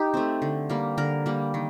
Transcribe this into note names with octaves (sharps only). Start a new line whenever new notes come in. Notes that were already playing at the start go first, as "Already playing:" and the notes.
Already playing: D#4 G4
A3 C4
D3
G3 A#3
D3 A#4
G3 A#3
D#3